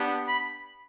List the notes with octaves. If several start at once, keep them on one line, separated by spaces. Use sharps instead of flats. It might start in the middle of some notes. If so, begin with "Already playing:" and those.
Already playing: B3 D4 G4
B5